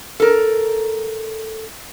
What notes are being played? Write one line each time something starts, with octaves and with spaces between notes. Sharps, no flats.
A4 A#4